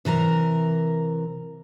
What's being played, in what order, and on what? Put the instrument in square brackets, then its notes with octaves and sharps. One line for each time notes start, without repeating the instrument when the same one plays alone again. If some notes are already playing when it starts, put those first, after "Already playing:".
[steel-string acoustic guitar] C3 E3 A#4 A#5